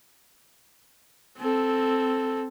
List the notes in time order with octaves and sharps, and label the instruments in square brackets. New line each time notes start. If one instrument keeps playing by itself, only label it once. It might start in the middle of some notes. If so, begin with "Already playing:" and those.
[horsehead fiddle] C4 A4